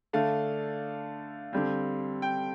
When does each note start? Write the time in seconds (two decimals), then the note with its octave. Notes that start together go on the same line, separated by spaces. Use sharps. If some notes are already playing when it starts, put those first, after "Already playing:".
0.13 D3 A3 D4 F5
1.53 D3 G3 C4
2.22 G5